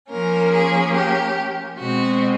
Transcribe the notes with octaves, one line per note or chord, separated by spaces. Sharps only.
F3 A#3 C#4 A#4
G#4
G4
B2 G#3 C4 F#4